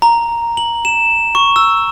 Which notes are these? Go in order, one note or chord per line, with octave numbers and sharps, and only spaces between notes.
A#5
F#7
E7
C#6
E6